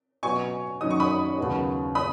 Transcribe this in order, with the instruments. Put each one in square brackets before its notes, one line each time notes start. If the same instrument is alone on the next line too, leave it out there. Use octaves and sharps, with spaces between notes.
[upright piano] B2 F#3 B3 F#4 [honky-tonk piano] G#5 C#6
[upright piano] F#2 D#3 F#3 D#4 F#4 [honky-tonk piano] D#6
[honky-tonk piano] C#6
B5 D#6
[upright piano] D#2 C#3 F#3 B3 F#4
[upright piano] C#3 [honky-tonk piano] B5 D#6